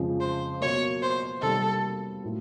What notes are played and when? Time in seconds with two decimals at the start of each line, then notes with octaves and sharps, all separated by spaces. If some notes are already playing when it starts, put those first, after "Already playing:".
Already playing: F2 C#3 F3 G#3
0.21 C5
0.61 B2 F#3 A#3 C#5
1.02 C5
1.42 C3 D#3 G3 A#3 A4
2.24 A2 F#3 A#3